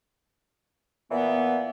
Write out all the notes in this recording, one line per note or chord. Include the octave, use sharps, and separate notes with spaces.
A#2 E3 B3